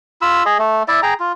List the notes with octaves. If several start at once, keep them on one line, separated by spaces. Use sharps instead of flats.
F4 B5 E6
G#4 D#5
A3
E4 D5 E5
G#4 G5 A#5
F4